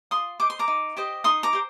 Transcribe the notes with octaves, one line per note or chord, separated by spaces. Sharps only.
F4 C6 D#6
C5 D#5 D6
C6
A#5 D6
D#4
G4 C5 D#5
D#4 C6 D#6
A#5 D6
G4 C5